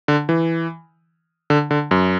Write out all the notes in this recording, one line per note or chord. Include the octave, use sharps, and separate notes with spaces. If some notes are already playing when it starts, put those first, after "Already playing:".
D3
E3
D3
D3
F#2